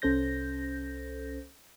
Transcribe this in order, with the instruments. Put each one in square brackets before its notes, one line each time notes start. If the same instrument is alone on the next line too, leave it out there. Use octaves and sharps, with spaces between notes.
[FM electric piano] C2 C#4 A4 C5 G6 A#6